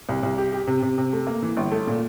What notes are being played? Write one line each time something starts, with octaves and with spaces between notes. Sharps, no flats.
C2
C2
G4
G4
C3
C3
C3
A3
A#3
E3
G1
A3
A#2